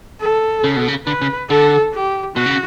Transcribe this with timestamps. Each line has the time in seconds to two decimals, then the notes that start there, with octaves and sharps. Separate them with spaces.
0.21 A4
0.64 C#3
0.76 B2
0.88 C#3
1.06 D3 B4
1.21 C#3
1.49 D3 A4
1.94 G4
2.36 B2 F#4
2.46 C#3